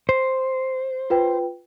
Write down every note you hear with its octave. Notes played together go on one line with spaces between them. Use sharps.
C5
F4 B4 G5